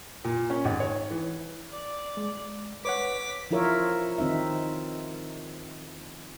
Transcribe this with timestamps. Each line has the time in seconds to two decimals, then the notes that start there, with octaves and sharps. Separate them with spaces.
0.24 A#2
0.50 C#4
0.65 G#1
0.80 C#5
1.11 E3
1.70 D5
2.17 G#3
2.85 B4 C#5 F#5 D6 B6
3.51 F3 E4 F4 A#4 C#5 E5
4.18 D#3 C4 D#4 E5